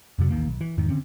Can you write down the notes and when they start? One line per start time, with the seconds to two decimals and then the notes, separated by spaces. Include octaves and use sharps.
0.19 F2 C3 F#3
0.31 A1 D#2 D#3 A#3
0.48 B1
0.61 E3
0.78 E2 G#2 D#3
0.89 D3 C4 C#4